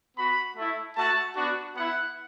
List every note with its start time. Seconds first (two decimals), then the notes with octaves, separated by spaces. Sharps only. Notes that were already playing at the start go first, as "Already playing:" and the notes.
0.16 B3 F#4 B5
0.56 A3 E4
0.96 A3 F#4 A5
1.35 B3 D4 F#4
1.75 B3 E4 F#5